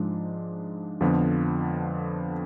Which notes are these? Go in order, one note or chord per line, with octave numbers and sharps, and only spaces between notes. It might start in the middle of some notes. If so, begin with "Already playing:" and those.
Already playing: G#2 F3 G#3 D4
F2 D3 F3 B3 F4